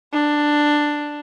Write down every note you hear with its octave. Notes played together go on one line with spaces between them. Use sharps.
D4